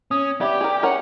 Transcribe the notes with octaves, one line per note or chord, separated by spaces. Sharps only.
C#4 D#6
B3 G4 D5 E5 D6
G#4 A#4
C#4 A#4 F#5